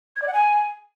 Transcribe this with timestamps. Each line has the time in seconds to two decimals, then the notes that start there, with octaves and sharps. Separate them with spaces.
0.16 G#6
0.22 D5
0.28 F#5
0.33 G#5